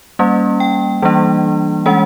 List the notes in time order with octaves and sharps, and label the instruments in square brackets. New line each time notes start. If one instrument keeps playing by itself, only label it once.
[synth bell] G3 A#3 C#4
G5
E3 G3 A#3 D4
E3 G#3 C#4 F#5